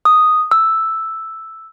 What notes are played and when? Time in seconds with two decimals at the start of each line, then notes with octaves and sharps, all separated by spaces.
0.05 D#6
0.51 E6